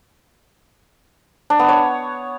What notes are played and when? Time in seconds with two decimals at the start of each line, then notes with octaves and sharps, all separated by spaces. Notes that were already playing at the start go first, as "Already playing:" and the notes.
1.50 D4
1.59 B3
1.69 C#5